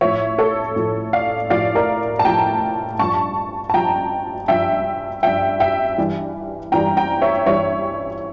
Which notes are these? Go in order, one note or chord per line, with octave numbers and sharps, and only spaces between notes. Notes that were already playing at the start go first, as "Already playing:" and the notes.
A2 F3 C#5 E5
A4 C#5
A2 F3
D5 F5
A2 F3 D5 F5
A#4 D5
A5
A2 F3 G5 A#5
G2 F3 A5 C#6
A5
G2 F3 G5 A#5
G2 F3 E5 G5
G2 F3 E5 G5
E5 G5
G2 E3 G3
G2 E3 G3 G5 A#5
G5 A#5
C#5 E5
G2 E3 G3 C#5 E5